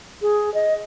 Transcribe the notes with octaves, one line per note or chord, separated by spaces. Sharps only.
G#4
D#5